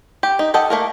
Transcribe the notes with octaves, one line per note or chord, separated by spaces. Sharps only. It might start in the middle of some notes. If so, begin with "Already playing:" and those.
G4
D#4
G4 A4 D#5 F#5 A5
A3 A#3 A#4